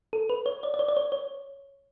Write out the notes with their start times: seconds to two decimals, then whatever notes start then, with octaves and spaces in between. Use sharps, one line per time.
0.13 A4
0.30 B4
0.46 C#5
0.63 D5
0.74 D5
0.79 C#5
0.88 D5
0.97 C#5
1.12 C#5